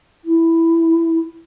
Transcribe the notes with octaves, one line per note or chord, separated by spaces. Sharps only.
E4